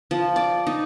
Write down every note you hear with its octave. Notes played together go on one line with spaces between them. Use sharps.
F3
D5
D#4